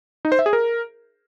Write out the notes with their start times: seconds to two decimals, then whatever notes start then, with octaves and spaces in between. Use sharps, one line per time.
0.25 D#4
0.32 C5
0.39 E5
0.46 G#4
0.53 A#4